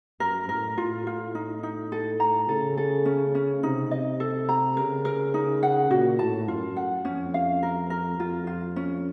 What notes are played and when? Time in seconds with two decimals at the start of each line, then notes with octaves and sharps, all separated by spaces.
0.20 F#2 A#4
0.49 A2 A#4
0.77 A2 F4
1.07 F4
1.35 D#4
1.63 D#4
1.92 A4
2.20 A#5
2.49 C#3 A4
2.77 A4
3.05 C#4
3.35 C#4
3.63 C3 D#4
3.91 D#5
4.20 A4
4.49 A#5
4.77 C#3 A#4
5.05 A#4
5.34 D#4
5.63 F#5
5.91 A#2 F#4
6.19 A2 A5
6.48 F#2 F4
6.77 F#5
7.05 F2 C#4
7.34 F5
7.63 A#4
7.90 A#4
8.19 F2 F4
8.47 F4
8.76 C#4